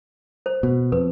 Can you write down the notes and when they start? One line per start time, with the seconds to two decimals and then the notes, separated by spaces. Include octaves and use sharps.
0.46 C5
0.63 B2
0.92 F2 B4